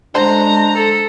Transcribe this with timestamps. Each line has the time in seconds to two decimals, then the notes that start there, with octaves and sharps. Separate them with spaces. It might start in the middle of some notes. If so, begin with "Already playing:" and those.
0.15 D3 G#3 D4 C5 A#5
0.75 A4